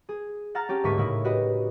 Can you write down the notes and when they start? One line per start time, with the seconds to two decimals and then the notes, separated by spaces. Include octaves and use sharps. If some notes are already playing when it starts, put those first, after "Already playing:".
0.09 G#4
0.55 F#5 A5 A#5 F6 A6
0.69 C#4 G4
0.84 D2 G#2 A#3 C#6 B6 D#7
0.97 A2 C#3 A#3 C#4 D#4 E4
1.24 F#4 G4 B4 D#5